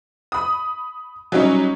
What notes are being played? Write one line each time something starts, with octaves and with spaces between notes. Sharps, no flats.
B5 D#6
F#3 G3 C#4 D#4 C#5